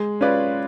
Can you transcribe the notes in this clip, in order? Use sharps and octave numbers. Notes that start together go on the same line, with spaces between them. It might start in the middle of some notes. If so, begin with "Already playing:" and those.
Already playing: G#3
C#4 F4 B4 D5